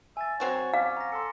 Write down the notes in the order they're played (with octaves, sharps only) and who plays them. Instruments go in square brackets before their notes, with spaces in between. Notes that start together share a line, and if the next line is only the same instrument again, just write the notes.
[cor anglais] E5 [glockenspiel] G#5 A6
[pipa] F#3 C4 F#4 [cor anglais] C#5
[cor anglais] C#4 [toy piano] F5 [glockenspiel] D6
[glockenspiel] A#5 A#6
[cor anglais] A4 [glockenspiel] C6 B6 C#7